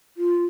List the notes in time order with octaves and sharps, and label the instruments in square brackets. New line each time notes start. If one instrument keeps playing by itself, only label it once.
[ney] F4